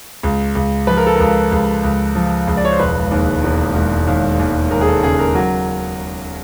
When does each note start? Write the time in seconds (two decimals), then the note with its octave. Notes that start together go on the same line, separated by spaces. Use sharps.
0.23 C#2
0.55 C#2
0.87 F3 B4
0.97 A#4
1.07 A4
1.16 C#2 A#4
1.52 C#2
1.83 C#2
2.15 F3
2.47 C#2
2.57 D5
2.65 C#5
2.72 C5
2.79 E1 B4
3.11 D#2
3.43 E1
3.75 E1
4.07 D#2
4.39 D#2
4.71 D#2 A#4
4.81 G#4
4.87 A4
5.03 C#3 G#4
5.19 A#4
5.35 F#3